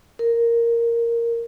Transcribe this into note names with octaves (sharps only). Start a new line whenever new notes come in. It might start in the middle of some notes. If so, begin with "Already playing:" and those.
A#4